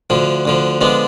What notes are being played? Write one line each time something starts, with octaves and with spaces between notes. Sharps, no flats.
D2 D3 F3
D2 D3 F3
D3 F3 G#3 B3 D4